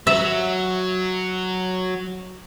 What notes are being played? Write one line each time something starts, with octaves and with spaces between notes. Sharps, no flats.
F#3 E5